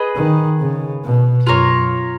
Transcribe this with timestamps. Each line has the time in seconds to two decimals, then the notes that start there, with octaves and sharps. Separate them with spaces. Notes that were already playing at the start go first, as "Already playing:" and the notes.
Already playing: G#4 B4 D#5
0.15 D#3
0.60 C#3
1.04 B2
1.47 F#2 F4 A#4 C#5